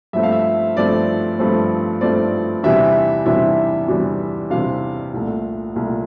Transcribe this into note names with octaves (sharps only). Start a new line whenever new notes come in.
G2 F3 A3 C4 E5
F5
E5
G2 F3 A3 C4 D5
G2 F3 A3 C4
G2 F3 A3 C4 D5
E2 C3 E3 G3 D4 E5
E2 C3 E3 G3 D4 E5
E2 C3 E3 G3 D4
E2 C3 E3 G3 D4 F5
C2 A#2 A3
C2 A#2 A3